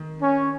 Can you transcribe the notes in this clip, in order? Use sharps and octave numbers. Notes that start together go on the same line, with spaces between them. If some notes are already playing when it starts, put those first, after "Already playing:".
Already playing: D#3
C#4